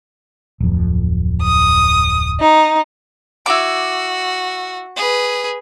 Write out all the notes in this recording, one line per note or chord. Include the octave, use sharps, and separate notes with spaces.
D1 F2
D#6
D#4
E4 F#4 D6
G#4 B4